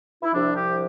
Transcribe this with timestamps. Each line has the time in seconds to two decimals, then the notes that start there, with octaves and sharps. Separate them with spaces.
0.23 E4
0.33 C2 C3 F3 D4
0.56 G4